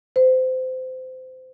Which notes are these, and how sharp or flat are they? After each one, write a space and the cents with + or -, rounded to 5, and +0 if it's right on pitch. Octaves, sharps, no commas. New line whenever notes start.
C5 -25